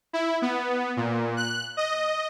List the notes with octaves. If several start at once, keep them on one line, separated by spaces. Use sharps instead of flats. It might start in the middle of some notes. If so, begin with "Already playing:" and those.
E4
B3
A#2
F#6
D#5